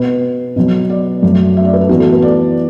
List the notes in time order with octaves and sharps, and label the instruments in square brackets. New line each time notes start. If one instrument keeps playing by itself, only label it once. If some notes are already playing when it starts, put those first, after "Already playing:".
Already playing: [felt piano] B2 B3 B4
B2 F#3 B3
D5
F#2 F#3 A3
E5
D5
B4
A4
A2 E3 B3 F#4
A4
B4
D5